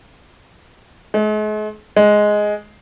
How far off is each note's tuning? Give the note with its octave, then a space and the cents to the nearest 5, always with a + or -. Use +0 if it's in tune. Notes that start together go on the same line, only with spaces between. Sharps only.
G#3 +45
G#3 +5